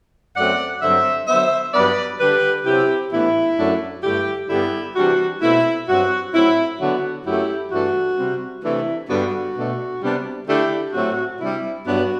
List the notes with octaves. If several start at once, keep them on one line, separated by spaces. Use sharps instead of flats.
F#2 F#3 A3 C4 D5 F#5
G2 D3 F#3 C4 C5 E5
D3 F#3 B3 C5 E5
G2 F#3 B3 D4 B4 D5
D3 G3 D4 G4 B4
C3 F#3 C4 E4 G4
A2 E3 B3 D4 E4
F#2 F#3 A3 D4
G2 D3 A3 E4 G4
G2 D3 G3 B3 E4 G4
C3 E3 G3 D4 F#4
B2 A3 C4 E4
G2 F#3 C4 F#4
A2 F#3 C4 E4
D3 F#3 B3 D4 F#4
F#2 F#3 A3 E4 G4
G2 E3 A3 D4 F#4
C3 G3 C4
C3 E3 A3 D4 E4
G2 D3 G3 B3 D4 F#4
B2 A3 D4
C3 G3 B3 D4
D3 A3 D4 E4 G4
A2 F#3 A3 C4 F#4
C3 G3 D4 E4
G2 F#3 B3 D4 F#4